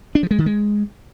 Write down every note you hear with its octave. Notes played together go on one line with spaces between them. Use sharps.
D4
F3
G#3
D#3
G#3